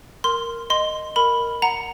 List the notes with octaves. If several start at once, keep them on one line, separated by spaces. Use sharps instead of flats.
A#4 C6
D#5 C6
A#4 B5
F#5 A#5